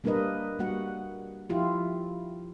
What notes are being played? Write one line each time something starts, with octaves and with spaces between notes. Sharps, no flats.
G3 A#3 D4 A#4 B4 D#5
G3 A#3 F#4 F#5
F3 E4 F4 G4